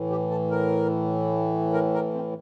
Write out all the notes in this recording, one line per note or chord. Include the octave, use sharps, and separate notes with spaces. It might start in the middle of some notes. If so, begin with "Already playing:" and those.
Already playing: A2 E3
G4
A4
A#4
A#4
A#4
C4